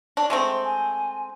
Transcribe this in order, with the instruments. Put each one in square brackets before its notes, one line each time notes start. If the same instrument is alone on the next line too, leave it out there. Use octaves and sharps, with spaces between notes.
[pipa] D4
G#3 A3 C4
[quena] G#5